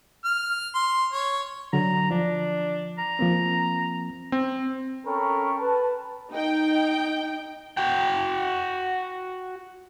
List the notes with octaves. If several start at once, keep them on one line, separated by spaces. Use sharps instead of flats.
F6
C6
C#5
D3 F#3 A#5
F3 D4
A#5
F3 A#3 C4
C4
C#4 A4 A#4 G5 B5 C#6
B4 A5
D#4 G5
F#4 G5